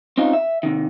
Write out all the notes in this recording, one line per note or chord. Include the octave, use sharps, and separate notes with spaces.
C4 C#4 D#4 F4
E5
C3 D#3